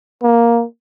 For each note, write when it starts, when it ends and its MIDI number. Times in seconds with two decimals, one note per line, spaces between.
0.23 0.64 58